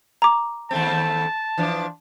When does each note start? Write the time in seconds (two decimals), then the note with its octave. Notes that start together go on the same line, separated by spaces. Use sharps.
0.22 A#5 D6
0.71 D#2 A3 C4 A5
1.57 E3 F3 D4